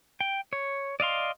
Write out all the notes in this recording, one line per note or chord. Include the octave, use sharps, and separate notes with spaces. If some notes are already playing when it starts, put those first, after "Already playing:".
G5
C#5
D5 D#5 F5 C6